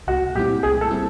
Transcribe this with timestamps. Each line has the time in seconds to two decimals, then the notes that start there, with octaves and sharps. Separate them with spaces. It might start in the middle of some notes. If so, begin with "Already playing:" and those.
0.08 C2 F#4
0.35 A#2 G3 C4 E4 G4
0.63 C2 G#4
0.81 A4
0.91 A#2 G3 C4 E4